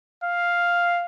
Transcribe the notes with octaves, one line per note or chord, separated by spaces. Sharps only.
F5